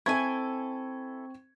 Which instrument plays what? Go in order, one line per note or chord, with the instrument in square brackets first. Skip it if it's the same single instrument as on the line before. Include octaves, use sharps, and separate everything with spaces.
[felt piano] C4 C#6 G#6 [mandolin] E4 A4 G#5